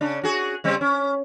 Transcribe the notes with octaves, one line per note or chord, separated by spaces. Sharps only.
C#3 D4
F#4 G#4
C#3 G3 C4
C#4